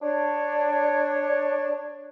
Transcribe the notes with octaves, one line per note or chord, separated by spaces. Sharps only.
D4 C#5